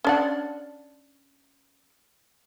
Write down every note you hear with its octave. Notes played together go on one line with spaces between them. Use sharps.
C#4 D4 F#5